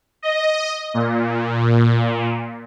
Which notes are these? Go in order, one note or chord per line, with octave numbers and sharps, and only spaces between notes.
D#5
A#2